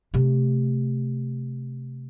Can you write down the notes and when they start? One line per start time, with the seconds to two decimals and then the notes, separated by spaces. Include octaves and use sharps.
0.14 C3 A3